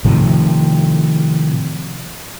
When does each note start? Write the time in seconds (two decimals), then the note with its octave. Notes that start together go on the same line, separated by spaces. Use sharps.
0.05 A2 C3 D#3 F3